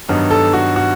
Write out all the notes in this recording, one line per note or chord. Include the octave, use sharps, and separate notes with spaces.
G2 D#3 F#3 B3 D#4
A4
F#4
F#4